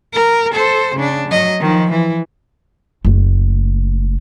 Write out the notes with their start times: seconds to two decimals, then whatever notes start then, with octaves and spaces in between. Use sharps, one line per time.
0.13 A#4
0.54 A4 C5
0.96 C#3 D4
1.29 F#3 D#5
1.61 D#3 F3
1.91 E3
3.05 F#1 A3